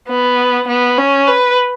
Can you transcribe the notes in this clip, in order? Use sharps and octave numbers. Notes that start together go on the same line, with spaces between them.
B3
B3
C#4
B4